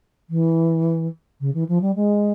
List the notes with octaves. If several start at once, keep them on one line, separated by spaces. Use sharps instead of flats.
E3
C#3
E3
F3
G3
G#3